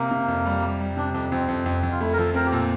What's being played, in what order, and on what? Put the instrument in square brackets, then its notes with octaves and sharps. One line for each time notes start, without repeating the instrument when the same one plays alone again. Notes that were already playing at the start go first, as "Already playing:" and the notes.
Already playing: [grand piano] C3 [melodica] A#3
[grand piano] C3
F2
G3
G3
G3
[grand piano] C3 [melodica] D4
[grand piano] F2 [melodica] D4
[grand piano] F2 [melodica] C4
[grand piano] F2
F2
F2
[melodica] F4
[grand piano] A3 [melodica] E4
[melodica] A#4
[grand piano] F3 [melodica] A4
[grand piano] C4 [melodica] A#4
[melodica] G4
[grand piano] A#2 [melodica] A4